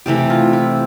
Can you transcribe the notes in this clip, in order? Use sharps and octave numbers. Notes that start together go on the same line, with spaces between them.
C3 E3 A3 G4
F4
E4